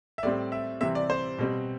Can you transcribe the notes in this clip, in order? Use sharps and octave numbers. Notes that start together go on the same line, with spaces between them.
E5
A2 G3 C4 D5
E5
C3 E3 G3 C4 E5
D5
C5
B2 G3 C4